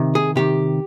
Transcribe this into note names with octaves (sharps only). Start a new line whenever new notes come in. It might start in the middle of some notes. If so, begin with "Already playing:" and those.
Already playing: C3 D#3
G#4
C3 D#3 G4